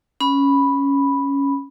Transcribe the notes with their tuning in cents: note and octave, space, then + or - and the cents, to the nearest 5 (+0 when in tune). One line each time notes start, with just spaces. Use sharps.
C#4 +0 B5 +0